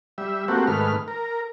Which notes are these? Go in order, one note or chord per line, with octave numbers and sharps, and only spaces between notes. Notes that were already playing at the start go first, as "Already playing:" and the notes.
G3 E5
A3 A#3 C4 F#4 G4
G#2 D#3 A3 B4 F6
A#4